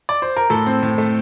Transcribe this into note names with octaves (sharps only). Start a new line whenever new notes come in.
D5
C5
A#4
A2 A4
C4
A2
A3